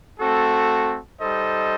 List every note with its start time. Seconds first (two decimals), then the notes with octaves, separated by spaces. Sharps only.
0.19 A3 C4 F#4 A4
1.19 G3 D#4 A4 C5 D#5